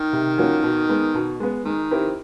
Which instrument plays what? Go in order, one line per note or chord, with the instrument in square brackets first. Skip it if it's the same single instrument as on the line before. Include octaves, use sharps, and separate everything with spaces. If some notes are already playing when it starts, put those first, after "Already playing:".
Already playing: [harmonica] D#3
[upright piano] C3
F3 A#3 C#4 F#4
B2
G#3 B3
B2
G#3 B3
[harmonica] D#3 [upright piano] G#3
[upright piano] C4 E4 G4 A#4